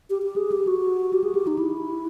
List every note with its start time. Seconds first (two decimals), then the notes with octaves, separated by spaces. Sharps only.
0.10 G4
0.22 G4
0.36 G#4
0.52 G4
0.67 F#4
1.13 G4
1.24 G#4
1.35 G4
1.47 D#4
1.59 E4